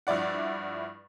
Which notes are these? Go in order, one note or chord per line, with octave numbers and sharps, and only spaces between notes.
G2 F3 E4 D5 F#5